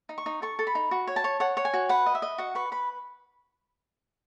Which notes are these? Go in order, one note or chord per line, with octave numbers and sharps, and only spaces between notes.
D#4
C#6
D#4
A4 C#6
A4
B5
D#4
F#4
C#5
A5
C#5
C#5 F#5
C#5
G#5
F#4
B4 F#5
D#5
E5
D#5
F#4 F#5
B4 C#6
B4 B5